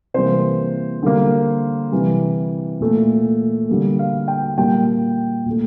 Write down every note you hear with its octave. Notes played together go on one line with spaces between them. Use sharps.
C3 E3 G3 A#3 C5
D3 G3 A#3
C3 E3 G3
A#2 A3
D3 G3 A#3
F5
G5
A#2 G3 A#3 G5
A#2 A3